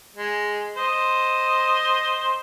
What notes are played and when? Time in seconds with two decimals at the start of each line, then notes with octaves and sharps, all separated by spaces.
0.16 G#3
0.77 C5 D#5